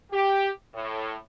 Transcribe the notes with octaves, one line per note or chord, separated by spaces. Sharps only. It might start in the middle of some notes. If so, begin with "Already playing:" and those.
G4
A2